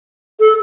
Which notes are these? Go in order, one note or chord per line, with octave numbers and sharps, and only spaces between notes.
A4